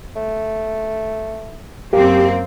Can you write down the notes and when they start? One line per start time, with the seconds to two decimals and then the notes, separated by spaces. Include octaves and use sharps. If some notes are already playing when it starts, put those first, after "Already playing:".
0.15 A3
1.93 F#2 A#3 C4 G4